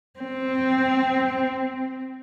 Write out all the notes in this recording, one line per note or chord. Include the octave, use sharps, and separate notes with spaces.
C4